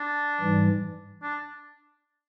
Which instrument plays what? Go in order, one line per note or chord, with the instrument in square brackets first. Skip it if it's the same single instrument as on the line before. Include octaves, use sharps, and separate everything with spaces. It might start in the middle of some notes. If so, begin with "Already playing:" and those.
Already playing: [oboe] D4
[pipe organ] G#2 E3 G3
[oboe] D4